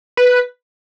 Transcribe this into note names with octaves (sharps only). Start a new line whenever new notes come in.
B4